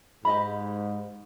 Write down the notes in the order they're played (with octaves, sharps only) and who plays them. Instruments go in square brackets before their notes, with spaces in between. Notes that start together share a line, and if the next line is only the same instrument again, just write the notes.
[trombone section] G#2 [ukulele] G4 D#5 B5